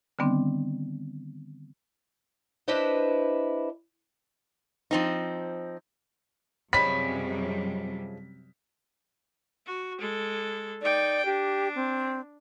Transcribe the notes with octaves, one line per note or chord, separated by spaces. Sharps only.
D3 D#3 G3 B3 C4 D4
D4 E4 G4 B4 C5 D#5
F3 C4 D#4
F#2 C3 F3 G3 G#3 C#4 B5 B6
F#4
G#3 A4
D#4 D5 G5
D4 G4
C4